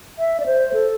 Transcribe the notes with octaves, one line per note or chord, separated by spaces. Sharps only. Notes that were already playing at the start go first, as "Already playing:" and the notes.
E5
D5
C5
A4